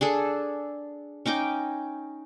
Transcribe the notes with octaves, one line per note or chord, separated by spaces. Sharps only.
D4 G#4 A4
C#4 D#4 G5 D6